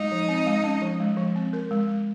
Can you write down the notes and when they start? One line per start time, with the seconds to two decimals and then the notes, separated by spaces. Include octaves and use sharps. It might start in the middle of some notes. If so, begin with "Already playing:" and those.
Already playing: G#3 D#4
0.12 F3
0.29 C4
0.47 G#3
0.64 C#4
0.82 F3
1.00 G#3
1.17 F3
1.36 C4
1.53 A#4
1.71 G#3
1.87 G#3